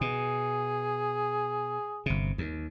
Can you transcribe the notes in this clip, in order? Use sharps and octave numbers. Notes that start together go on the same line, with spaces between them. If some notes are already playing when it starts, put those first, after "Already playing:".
B2 G#4
G1 C3
D#2